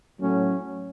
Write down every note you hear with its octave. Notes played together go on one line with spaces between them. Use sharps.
A2 F#3 A3 C#4